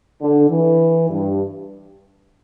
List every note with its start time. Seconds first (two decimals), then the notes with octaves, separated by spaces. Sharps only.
0.20 D3
0.50 E3
1.09 G2